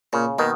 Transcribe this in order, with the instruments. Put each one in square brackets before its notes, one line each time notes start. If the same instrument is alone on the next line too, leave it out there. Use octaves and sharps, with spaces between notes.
[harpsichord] A#2 [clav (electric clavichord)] C#3
[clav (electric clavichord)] B2 D#3 [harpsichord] A#3